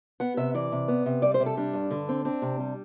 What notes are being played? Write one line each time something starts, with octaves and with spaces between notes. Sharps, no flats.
B3 F#5
C3 E5
E3 D5
C3
B3
C3
G3 D5
C5
C3
A4
G3 D4
G2
D3
C4
C4 D4
C3
G3